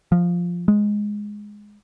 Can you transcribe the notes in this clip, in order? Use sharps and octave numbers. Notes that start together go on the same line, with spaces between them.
F3
G#3